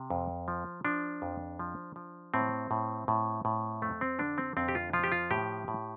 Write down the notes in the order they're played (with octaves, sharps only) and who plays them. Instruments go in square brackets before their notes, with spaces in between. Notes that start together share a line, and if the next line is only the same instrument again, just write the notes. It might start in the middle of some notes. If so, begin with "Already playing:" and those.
Already playing: [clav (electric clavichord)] C3
F2
F3
F3 D4
F2
F3
F3
A2 C4
A2
A2
A2
F2 A3
C4
D3 D4
C4
F2 C4
G4
F4
F3 F4
G4
F4
A2 G4
A2